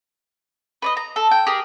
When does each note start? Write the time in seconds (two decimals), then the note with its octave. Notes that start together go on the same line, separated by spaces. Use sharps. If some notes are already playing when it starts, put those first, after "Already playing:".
0.82 B4 D5 D#5
0.97 A#5
1.16 A4
1.31 G5
1.47 G4 G#4 A#4